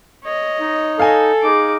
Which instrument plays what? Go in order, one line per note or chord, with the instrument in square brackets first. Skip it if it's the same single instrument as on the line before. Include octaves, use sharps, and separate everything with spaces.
[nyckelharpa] C#5 D#5
[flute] D#4
[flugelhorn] A4 [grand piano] F5 G#5
[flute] D#4 [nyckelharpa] G#4 D6